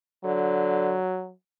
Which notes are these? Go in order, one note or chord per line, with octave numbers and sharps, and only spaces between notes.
D3 F#3